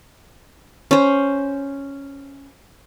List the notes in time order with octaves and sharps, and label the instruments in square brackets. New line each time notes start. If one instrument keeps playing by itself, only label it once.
[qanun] C#4 C5